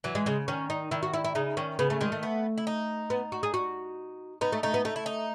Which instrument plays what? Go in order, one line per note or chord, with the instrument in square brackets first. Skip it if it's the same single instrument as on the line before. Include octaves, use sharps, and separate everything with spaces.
[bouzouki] E3 [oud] F#3
[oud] G#3
[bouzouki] C#3 [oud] G#3
[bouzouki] D#3 [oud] C#4
[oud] D#4
[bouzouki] D#3 [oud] E4
[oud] F#4
E4
E4
[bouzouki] C#3 [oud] D#4
[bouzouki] D#3 [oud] C#4
[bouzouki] C#3 [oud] B3
[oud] A3
[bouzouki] D#3 [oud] G#3
[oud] A3
[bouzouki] B3
E4
D#4
[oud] B3
F#4
G#4
F#4
[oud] B3 [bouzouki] D#4
[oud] A3
[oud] A3 [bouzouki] D#4
[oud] B3
[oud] A3 [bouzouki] D#4
[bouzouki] E4
D#4